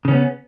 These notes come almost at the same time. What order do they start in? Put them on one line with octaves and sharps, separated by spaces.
C#3 C#4 B3